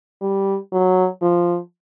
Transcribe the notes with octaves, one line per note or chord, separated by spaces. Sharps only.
G3
F#3
F3